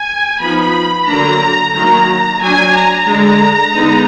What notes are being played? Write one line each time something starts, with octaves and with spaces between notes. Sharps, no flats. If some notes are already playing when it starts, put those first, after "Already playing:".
Already playing: G#5
F3 B3 D#4 B5
D3 F#3 A#3 D4 A#5
D#3 F#3 A#3 A#5
F#3 D4 G#5
A#5
D3 G#3 D4
D3 G#3 B3 D#4